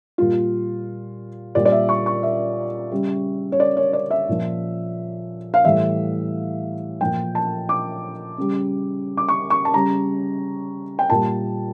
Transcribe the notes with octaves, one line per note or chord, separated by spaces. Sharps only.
A#2 G3 F4
A#2 G3 D5
D5
E5
C#6
C#6
E5
C#3 G3
C#5
D5
C#5
D5
E5
A#2 F3
F5
A2 E3 G3 E5
A#2 F3 G5
A5
D6
C#3 G3
D6
C#6
C#6
A5
C#3 G3 A#5
G5
A#2 G3 A5